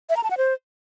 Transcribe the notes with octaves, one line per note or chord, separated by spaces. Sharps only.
E5
A#5
A5
F#5
C5